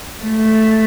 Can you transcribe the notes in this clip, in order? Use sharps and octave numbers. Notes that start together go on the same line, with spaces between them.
A3